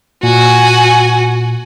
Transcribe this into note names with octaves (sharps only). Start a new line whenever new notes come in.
A#2 F#4 G#5